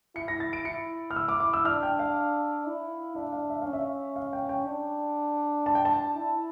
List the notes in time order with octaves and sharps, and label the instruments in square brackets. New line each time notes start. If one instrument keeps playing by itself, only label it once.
[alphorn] E4 [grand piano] C#7
[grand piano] A#6
A6
D7
[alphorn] E4 [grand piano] C#7
[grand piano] F6
E6
D6
D6
E6
[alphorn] D4 [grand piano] F6
[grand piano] G5
F5
[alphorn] E4
[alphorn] D4 [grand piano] E5
[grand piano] F5
E5
[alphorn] C#4 [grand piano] F5
[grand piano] E5
F5
G5
G5
[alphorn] D4
[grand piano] A5
G5
A5
[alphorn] E4